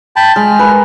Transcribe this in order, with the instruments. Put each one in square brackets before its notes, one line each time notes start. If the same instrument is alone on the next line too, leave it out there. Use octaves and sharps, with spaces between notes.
[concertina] G5 A5 B5
[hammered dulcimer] G#3 [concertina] F6
[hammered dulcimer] A#4 B4